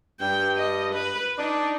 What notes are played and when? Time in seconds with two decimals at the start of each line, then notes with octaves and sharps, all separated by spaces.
0.20 G2 G5
0.57 D#5
0.94 B4
1.38 D4 D#4